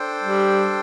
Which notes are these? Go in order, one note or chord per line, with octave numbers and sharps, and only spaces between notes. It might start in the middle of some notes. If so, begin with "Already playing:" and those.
Already playing: D4 A4 C5 G5
G3